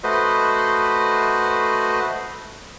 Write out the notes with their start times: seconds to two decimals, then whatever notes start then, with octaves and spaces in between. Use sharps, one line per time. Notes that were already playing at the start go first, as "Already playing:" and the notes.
0.04 A3 F#4 B4 C5 D#5